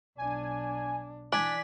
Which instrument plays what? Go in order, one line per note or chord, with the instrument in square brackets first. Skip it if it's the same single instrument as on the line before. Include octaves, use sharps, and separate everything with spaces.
[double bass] B1 D4 [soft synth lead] G#5
[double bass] E3 [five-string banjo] D4 [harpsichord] D5 G#5 [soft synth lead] B6